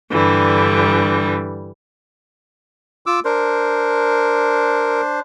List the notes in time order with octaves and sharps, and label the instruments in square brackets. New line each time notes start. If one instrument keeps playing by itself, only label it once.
[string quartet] G2 D3 E3 G3
[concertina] F4 D6 E6
[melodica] D4 C5 [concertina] A#4